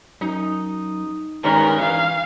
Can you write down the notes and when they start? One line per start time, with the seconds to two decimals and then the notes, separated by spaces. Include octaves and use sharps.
0.21 F#2 D#4
1.44 G2 D#3 G#3 C#4 A#4
1.81 E3 F5